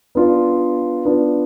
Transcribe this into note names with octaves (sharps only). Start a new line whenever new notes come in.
B3 D4 F4
B3 D4 F4